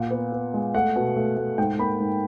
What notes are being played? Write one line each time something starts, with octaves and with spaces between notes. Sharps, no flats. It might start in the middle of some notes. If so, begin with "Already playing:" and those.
Already playing: A#2 F#5
B3
B3
G#3
A3 F#5
B2
A3
A3
G#2 G5
A#3 B5
G#2